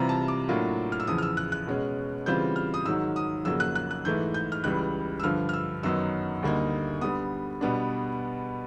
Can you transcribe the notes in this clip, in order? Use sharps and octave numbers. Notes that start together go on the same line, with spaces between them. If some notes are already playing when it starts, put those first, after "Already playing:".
Already playing: C3 E3 G3 C4 F4 A#5
A5
D6
A2 F#3 A#3 D4 F4
F6
E6
E2 C#3 F3 D#6
F6
E6
F#6
F#6
B2 G#3 C#4
C#3 E3 G3 C4 F4 G6
F6
D#6
G#2 D#3 F#3 E6
D#6
F2 C#3 F#3 A#3 E6
F#6
F#6
F#6
G#2 E3 A3 G6
G6
F6
C#2 C#3 E3 G3 F#6
E6
G2 D3 F3 F6
F6
E6
F#2 D#3 F#3 B3 D#4 E6
D2 D3 G3 A#3 D#4
D3 G3 B3 D#6
B2 G3 B3 D4